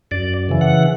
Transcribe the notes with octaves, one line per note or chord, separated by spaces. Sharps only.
F#2 D5
C#3 E3
F#5